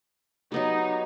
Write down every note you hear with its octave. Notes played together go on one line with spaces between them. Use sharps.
F#3 B3 D#4 G4